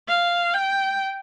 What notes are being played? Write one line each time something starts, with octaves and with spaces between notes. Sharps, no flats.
F5
G5